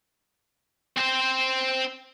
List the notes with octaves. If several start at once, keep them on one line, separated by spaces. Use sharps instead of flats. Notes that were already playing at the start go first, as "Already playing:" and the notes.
C4 C5